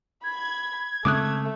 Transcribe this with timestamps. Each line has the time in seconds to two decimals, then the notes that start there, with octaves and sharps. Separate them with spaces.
0.24 B5 G#6
1.05 C#3 G#3 A3 C4 D6 D#6 F#6